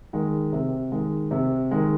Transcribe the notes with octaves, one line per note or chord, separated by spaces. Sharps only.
D#3 G#3
C3
D#3 G#3
C3
D#3 G#3